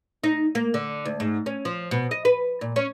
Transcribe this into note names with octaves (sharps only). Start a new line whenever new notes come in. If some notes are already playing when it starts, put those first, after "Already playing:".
D#4
A#3
D3
D2
G#2
C#4
F3
B2
D#5
B4
A#2
C#4